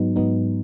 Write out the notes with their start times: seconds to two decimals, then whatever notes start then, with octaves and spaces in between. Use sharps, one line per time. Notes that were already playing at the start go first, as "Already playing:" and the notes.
Already playing: G#2 F#3 B3 D#4
0.16 G#2 F#3 B3 D#4